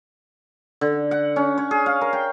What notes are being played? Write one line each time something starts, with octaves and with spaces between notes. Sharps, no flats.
D3
F#5
C#4
C#5
G#4
F5
A#4
G5